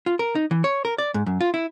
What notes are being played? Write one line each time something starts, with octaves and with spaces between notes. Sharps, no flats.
F4
A#4
D#4
E3
C#5
A#4
D5
G#2
F#2
F4
E4